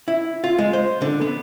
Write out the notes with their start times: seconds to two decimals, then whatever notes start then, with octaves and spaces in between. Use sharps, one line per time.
0.08 E4
0.44 F4
0.59 G#3
0.73 C5
1.02 D3
1.21 B3